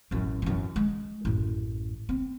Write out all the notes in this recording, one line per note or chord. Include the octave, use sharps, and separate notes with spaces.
A1 F#2
F#2 E3
G#3
A1 F#2
C4